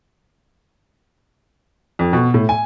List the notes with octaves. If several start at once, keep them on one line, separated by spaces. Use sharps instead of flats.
F2
B2
A2
G#5